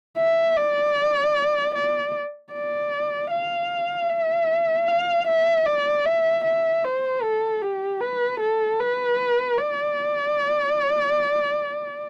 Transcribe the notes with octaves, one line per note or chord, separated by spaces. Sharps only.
E5
D5
D5
D5
F5
E5
F5
E5
D5
E5
E5
C5
A4
G4
B4
A4
B4
D5